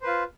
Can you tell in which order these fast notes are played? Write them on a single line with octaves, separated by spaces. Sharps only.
C5 B4 F4